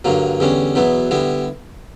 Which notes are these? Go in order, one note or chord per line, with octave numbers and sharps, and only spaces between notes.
G2 D3 F#3 A#3
E2 D3 G3 C#4
E2 B2 F#3 B3 E4
D3 G3 B3 E4